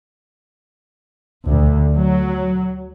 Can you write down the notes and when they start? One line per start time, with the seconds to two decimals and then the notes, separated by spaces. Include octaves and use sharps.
1.46 D2
1.95 F#3